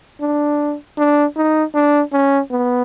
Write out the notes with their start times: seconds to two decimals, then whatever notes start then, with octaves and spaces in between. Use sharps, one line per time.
0.21 D4
0.98 D4
1.37 D#4
1.75 D4
2.13 C#4
2.52 B3